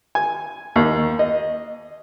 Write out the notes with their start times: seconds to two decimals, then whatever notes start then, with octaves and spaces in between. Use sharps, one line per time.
0.15 G#5
0.76 D#2
1.19 D#5